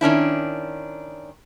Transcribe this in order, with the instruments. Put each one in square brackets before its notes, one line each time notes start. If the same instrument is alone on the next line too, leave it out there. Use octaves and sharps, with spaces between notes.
[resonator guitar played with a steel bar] D#3 C#4 D4 E4